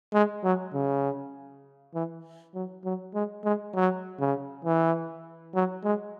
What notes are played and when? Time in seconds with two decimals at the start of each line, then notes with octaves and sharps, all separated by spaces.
0.14 G#3
0.44 F#3
0.74 C#3
1.95 E3
2.55 F#3
2.85 F#3
3.14 G#3
3.44 G#3
3.74 F#3
4.20 C#3
4.65 E3
5.54 F#3
5.84 G#3